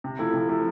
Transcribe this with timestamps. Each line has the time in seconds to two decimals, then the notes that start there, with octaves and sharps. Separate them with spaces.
0.04 C3
0.19 F3 A3 E4
0.34 C3
0.49 F3 A3 E4